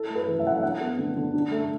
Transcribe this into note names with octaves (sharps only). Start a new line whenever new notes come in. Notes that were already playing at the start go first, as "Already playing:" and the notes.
Already playing: E4 A4
A3
B4
E3
E5
E3 F#5
E5
D4 F#5
B3
D3
D3
D4
A3